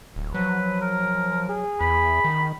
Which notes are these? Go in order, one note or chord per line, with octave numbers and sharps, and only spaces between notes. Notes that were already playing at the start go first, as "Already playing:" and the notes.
D1
F3 F#3 B4
A#4
G#4
E2 B5
D#3